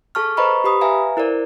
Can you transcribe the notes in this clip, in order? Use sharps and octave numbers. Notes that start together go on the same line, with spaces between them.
G#4 A4 A5 C#6 F6
B4 C5 D#5 A#5 B5 C#6
G4 B4 B5 D#6
B4 E5 F5 G#5 A#5
E4 A#4 C5 D5